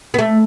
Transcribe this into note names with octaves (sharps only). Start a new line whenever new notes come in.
B3
A3